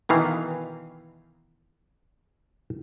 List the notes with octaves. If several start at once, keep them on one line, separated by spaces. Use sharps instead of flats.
B2 D#3 E3 F5